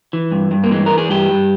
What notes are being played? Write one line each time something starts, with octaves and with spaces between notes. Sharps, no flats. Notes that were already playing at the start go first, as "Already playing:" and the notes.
E3
G2
G2
A#3
E3 G#3
E3 A#4
G#4
G2 G4
G2